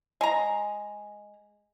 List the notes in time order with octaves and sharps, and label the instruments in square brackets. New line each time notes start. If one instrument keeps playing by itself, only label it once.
[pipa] G#3 A#5